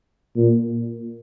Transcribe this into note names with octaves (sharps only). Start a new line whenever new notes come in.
A#2